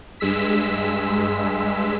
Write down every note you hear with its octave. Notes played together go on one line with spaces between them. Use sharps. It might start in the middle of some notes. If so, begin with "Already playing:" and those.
G2 G#3 E6 B6